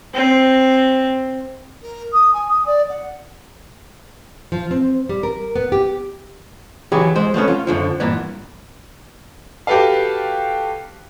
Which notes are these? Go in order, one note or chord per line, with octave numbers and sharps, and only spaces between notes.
C4
A#4
D#6
G#5
D#6
D5
F#5
F3
C4
G3
A#4
B3
G4
E3 F#3 G4 G#4
G#3 C5
F3 A3 B3 C#4
F4
F#2 D3 F3
G2 A#2 E3 B3
F#4 G4 A4 B4 F5